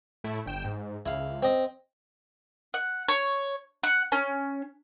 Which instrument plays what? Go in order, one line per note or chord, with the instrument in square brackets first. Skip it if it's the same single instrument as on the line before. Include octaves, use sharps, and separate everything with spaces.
[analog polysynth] A2 A3 E4
G1 G5 E7
G#2
[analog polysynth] C#2 [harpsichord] E4 F5
[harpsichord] C4 D#5
[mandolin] F#5
C#5
F#5
C#4